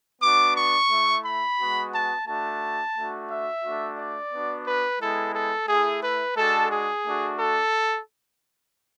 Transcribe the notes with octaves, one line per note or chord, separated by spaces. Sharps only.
B3 D4 F#4 D6
C#6
A3 E4
B5
G#3 B3 F#4
A5
A3 D4 F#4 A5
A3 D4 F#4
E5
A3 D4 F#4
D5
B3 D4 F#4
B4
G#3 B3 E4 A4
A4
A3 E4 G#4
B4
G#3 D4 F#4 A4
G#4
A3 D4 F#4
A4